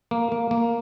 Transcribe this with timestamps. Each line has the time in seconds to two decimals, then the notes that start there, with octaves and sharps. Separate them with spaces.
0.11 A#3
0.32 A#3
0.51 A#3